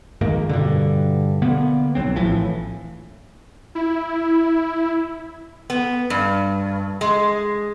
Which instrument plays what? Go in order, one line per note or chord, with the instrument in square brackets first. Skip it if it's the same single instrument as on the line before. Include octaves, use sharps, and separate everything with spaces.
[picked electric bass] F2 G#2 D#3 A#3
G2 B2 D3
D3 A#3 B3
B1 E2 F#3 C4
A#1 A2 E3 F3
[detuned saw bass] E4
[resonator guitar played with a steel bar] B3
G2
G#3